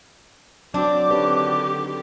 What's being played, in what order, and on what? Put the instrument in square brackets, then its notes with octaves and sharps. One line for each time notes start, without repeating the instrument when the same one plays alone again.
[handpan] F#3 F#4 [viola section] C4 [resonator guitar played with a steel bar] D4 [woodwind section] D6
[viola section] D3 D#3 G4 [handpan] C4 B4 C#5